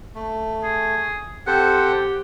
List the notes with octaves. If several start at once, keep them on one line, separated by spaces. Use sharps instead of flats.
A3
G#4
C4 G4 A4 C5 F#5